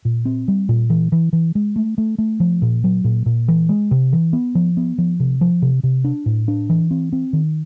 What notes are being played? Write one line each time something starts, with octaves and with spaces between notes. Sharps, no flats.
A#2
C4
G3
A#2
E3
E3
E3
G#3
A3
A3
A3
F3
A#2
F#3
A#2
A#2
E3
G#3
C3
E3
B3
F3
B3
F3
C3
F3
C3
C3
D4
A2
D4
E3
C4
C4
D#3